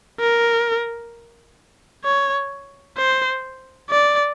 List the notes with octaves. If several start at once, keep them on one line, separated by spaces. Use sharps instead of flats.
A#4
C#5
C5
D5